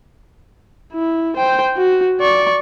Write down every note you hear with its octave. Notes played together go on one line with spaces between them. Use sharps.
E4
C5 G5
F#4
D5 C#6